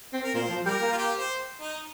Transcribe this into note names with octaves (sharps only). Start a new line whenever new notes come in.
C4
A#4
A#2 C5
F3
G3 A#4
A#3
F4
G4
C5
D#4